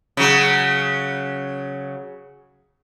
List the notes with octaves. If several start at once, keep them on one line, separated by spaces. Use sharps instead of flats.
C#3 F#3